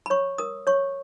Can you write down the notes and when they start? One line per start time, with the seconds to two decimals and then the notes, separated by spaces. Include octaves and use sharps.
0.06 B5
0.10 C#5 C#6
0.38 A#4 D#6
0.67 C#5 C#6